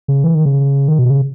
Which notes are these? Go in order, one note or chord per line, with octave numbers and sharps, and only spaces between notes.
C#3
E3
D#3
C#3
D#3
B2
C#3